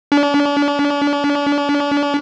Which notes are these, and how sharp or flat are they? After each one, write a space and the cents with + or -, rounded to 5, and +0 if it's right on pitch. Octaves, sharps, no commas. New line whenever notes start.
D4 -40